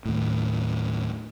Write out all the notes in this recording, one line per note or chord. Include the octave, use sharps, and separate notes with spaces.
D#2 A2